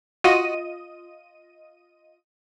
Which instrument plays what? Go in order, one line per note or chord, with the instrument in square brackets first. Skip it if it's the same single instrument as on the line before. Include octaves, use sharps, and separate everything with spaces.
[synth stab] F4 D#5 D#7 [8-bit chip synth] F#4